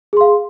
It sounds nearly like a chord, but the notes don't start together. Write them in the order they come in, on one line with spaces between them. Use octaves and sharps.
G#4 C6 F5